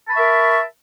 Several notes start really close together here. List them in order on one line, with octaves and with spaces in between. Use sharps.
A5 B5 C#6 E5 A#4